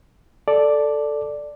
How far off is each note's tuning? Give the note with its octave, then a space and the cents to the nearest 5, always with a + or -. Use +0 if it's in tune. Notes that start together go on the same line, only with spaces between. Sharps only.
A4 +0 D5 +0